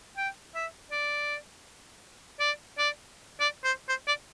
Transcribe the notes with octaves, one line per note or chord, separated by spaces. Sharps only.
G5
E5
D5
D5
D5
D5
C5
C5
D5